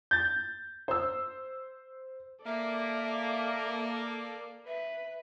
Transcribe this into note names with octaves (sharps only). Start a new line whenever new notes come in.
G6 A6
C5 E6
A#3 A4 D5 E5
B4 E5